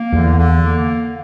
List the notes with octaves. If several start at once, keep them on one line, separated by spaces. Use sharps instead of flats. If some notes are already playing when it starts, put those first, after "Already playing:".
Already playing: A#3
E2 D3
D3
A#3